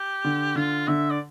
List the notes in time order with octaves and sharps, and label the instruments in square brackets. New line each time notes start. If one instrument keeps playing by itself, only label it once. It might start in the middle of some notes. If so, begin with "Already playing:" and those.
Already playing: [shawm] G4
[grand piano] D3
[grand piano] D3 [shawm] F4
[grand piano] D3 [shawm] E5
[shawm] D5